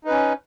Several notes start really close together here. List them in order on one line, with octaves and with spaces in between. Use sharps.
D#4 B4 C#4